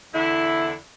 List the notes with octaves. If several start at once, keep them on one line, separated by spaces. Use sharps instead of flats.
E2 D3 E4